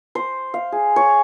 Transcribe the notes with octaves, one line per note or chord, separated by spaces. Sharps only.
C5
F5
G#4
C#5